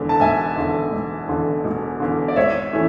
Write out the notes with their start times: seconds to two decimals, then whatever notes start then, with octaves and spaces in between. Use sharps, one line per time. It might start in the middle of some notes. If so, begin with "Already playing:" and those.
Already playing: E1 E2 D3
0.09 A5
0.20 E1 E5 G#5
0.57 E2 D3
0.92 E1
1.28 E2 D3
1.64 E1
2.00 E2 D3
2.28 D5
2.36 G#1 C#5 E5
2.73 E3 A3 C#4